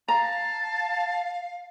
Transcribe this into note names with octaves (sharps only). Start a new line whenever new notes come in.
F5 A5 A#5